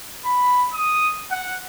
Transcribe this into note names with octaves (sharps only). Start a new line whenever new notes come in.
B5
D#6
F#5